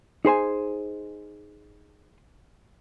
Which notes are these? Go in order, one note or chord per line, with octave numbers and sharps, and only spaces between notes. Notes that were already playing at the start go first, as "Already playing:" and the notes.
D#4 G#4 C5 G#5